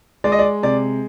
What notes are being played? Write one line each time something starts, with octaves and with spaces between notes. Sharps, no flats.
G#3 D5
D#5
D5
C3 D5